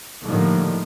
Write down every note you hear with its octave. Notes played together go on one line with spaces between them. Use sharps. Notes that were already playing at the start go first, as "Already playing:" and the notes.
A2 D3 D#3 F3 G3 A#3